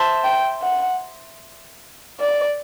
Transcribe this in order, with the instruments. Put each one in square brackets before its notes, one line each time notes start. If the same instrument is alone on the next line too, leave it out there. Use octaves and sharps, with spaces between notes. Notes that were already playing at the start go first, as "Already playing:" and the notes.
Already playing: [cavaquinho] C5 E5 A5
[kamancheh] G5
F#5
D5